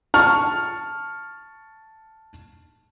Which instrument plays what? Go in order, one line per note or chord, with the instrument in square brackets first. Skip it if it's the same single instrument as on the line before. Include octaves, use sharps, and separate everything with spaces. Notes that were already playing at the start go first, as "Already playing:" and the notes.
[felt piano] A5 C#6 F6